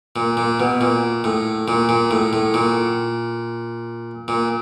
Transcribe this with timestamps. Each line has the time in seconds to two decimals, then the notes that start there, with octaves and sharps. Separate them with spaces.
0.16 A#2
0.37 A#2
0.60 B2
0.81 A#2
1.24 A2
1.68 A#2
1.89 A#2
2.11 A2
2.33 A2
2.54 A#2
4.28 A#2